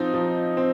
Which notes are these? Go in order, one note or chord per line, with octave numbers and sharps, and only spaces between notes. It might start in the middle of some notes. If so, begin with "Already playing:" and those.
Already playing: F3 C4 D#4
F3
C4